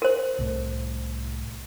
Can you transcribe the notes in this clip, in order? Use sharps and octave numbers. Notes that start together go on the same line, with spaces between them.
A#4 C5
C2 A2